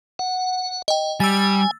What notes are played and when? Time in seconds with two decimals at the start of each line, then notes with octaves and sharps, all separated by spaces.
0.19 F#5
0.88 D#5 G5
1.20 G3 G#5 E6 A6